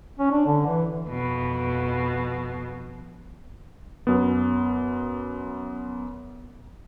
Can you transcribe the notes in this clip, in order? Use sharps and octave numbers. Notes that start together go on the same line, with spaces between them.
C#4
D4
D3
E3
F2 B2
F#2 B3